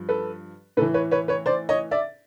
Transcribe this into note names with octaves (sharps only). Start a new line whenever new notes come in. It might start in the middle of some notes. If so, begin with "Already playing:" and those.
Already playing: G2 F3
A4 B4
A2 E3 A4 B4
B4 C#5
B4 C#5
B4 C#5
C5 D5
C#5 D#5
D5 E5